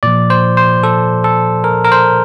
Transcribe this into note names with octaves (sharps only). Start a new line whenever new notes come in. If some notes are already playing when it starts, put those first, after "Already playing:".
A#2 F3 D5
C5
C5
A4
A4
A#4
A#4
C5